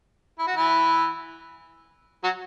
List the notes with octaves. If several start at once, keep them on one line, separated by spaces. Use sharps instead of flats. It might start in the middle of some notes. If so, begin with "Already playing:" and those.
E4
F#4
E3 E4
F#3 F#4